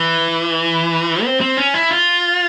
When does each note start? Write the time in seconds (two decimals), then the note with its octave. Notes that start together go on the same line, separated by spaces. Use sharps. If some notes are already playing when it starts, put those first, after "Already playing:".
Already playing: E3
1.24 C4
1.41 C4
1.57 C#4
1.74 E4
1.91 F4